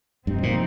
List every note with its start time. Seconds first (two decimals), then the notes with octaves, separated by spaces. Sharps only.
0.27 G2 C3 F3 C4 D#4
0.43 A#2